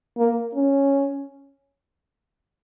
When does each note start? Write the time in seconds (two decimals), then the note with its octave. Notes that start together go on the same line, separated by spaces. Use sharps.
0.18 A#3
0.55 C#4